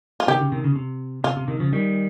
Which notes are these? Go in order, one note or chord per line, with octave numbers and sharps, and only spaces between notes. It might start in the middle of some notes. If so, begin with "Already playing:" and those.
F4
C3 D#3 G4
C#3
C3 D#3
C#3
C3
C3 F4
C3
C3 D#3
C#3 F3
D#3 G3